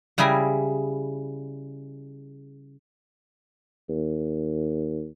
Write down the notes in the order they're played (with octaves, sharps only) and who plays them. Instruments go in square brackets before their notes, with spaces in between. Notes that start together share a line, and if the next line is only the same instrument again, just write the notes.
[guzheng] C#3 G3 E4 G#4 G#5 A#5
[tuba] D#2